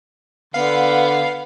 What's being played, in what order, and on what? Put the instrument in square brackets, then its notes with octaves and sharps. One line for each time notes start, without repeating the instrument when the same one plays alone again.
[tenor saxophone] D3 [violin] B3 [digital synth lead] F5